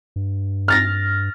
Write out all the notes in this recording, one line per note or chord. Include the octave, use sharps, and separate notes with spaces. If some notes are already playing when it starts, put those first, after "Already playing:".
G2
F6 A6 A#6